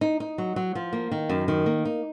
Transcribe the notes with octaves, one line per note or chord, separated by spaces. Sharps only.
D#4
D#4
F#3
F#3
F3
A#3
D#3
F#2
D#3
A#3
D#4